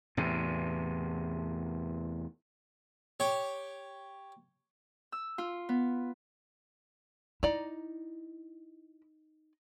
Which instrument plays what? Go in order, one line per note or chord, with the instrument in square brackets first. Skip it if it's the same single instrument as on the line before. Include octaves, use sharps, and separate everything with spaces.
[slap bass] E2 A2 C3
[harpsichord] G4 C#5
[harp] E6
F4
B3
[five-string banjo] D#4 D5 A#5 [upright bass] E4